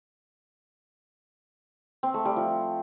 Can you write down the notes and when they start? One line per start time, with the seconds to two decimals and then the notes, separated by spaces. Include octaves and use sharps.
2.03 C4
2.14 A3
2.25 G3
2.36 F3